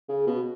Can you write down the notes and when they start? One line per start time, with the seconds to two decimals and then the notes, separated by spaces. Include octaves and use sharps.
0.09 C#3
0.27 B2